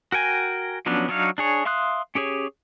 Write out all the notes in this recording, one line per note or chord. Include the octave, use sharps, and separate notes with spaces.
F#4 A#4 G5 G#5
F3 F#3 B3 C#4 D4
F#3 D4 D#4 C#5 F5
D4 G#4 C#5
E5 F5 C6 D#6 F#6
C#4 G4 G#4 C#5